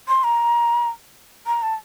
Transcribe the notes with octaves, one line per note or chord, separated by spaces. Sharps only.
C6
A#5
A#5
A5